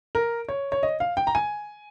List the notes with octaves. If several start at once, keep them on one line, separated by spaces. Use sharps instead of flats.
A#4
C#5
C#5
D#5
F5
G5
A#5
G#5